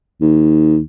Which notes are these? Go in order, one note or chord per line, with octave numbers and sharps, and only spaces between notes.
D#2